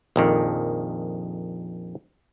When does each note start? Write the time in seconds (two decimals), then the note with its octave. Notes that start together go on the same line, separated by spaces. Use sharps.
0.16 A#1 F2 D#3